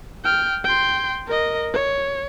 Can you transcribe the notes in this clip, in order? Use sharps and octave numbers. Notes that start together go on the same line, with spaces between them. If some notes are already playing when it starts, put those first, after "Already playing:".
G5 F6
G5 C6
A#4 D#5
C#5